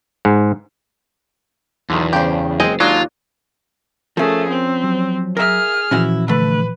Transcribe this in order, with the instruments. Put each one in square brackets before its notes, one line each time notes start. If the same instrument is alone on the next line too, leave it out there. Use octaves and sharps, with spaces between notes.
[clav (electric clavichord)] G#2
[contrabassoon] B1 [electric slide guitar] E2 [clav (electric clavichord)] D3 D#3
[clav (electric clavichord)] G2 [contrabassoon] C#3 [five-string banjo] G4 C5
[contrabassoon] F#1 [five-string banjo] G#3 C4 G#4 [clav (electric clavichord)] D#5
[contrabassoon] D#2 [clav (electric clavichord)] F#3 G#3 [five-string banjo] D4 [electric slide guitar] F4
[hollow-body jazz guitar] F3 C#4 [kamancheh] A3 G#4 [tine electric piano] A#4
[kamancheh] C4
[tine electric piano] F#3
[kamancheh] G#4 F6 [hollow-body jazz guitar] A#4 E5
[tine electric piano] A#2 E3 F3 [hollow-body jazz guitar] C#4 E4 F#4
[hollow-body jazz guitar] D3 A3 [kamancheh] B4